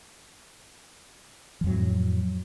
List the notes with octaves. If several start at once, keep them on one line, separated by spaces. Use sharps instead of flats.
F2 A2 F3 F#3